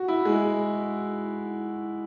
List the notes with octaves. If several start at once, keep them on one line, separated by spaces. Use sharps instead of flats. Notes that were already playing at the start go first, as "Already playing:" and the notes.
Already playing: F#4
E4
G#3